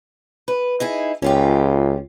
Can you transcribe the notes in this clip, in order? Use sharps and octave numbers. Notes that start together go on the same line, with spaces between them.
B4
D#4 E4 G#4
C#2 C#4 F4 G4